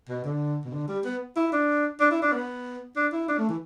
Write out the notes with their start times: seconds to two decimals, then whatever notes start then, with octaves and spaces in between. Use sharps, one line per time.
0.09 B2
0.24 D3
0.65 B2
0.73 D3
0.88 G3
1.05 B3
1.36 E4
1.52 D4
2.00 D4
2.11 E4
2.22 D4
2.32 B3
2.96 D4
3.12 E4
3.28 D4
3.38 A3
3.49 E3